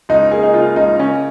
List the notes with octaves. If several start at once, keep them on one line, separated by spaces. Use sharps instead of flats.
C#2 D#4
A#3 G#4
D#4
C#3 F4
C#2 D#4
C#3 C#4